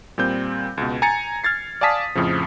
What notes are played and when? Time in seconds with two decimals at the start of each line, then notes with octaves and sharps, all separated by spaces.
0.18 A#2 G3 C4 G6
0.77 C#2 B2
1.02 G#5 A#5 G#6 A6 C#7
1.44 F6 G#6 A6 C7
1.81 D5 F5 G#5 A5 D#6 B6
2.15 F2 A2 C#3 F3